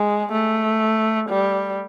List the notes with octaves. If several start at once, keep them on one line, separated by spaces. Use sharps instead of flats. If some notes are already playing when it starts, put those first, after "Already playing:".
Already playing: G#3
A3
G3